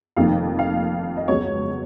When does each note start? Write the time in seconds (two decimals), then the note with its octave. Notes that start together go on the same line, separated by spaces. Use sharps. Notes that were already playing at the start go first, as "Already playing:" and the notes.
0.17 F1 F2 D#3 A#3 F5
0.59 F5
1.17 D#5
1.28 C#2 C#3 F#3 B3 C#5